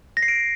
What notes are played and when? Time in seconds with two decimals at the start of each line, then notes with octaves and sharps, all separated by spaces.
0.17 A#6
0.23 C7
0.28 D7